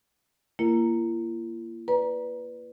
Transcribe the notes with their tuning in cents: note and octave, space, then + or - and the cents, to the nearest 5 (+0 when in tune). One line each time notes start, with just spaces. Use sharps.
A#3 +0 E4 +45 A#4 -5
B4 +0 D5 -15 A#5 +20